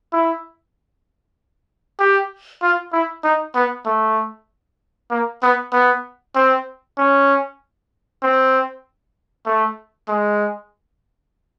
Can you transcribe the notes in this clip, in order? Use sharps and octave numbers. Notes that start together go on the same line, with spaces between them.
E4
G4
F4
E4
D#4
B3
A3
A#3
B3
B3
C4
C#4
C4
A3
G#3